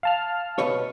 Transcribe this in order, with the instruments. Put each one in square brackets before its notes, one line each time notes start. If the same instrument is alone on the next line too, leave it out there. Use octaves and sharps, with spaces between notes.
[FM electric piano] F5 A5 F6
[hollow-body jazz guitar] B2 B4 C#5